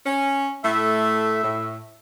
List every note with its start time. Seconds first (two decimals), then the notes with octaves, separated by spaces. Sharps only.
0.06 C#4
0.65 A2 A3 E5
1.43 A2